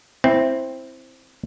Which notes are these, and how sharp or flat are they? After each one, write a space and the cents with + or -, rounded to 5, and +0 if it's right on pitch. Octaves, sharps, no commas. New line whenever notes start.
C4 +5 E4 +0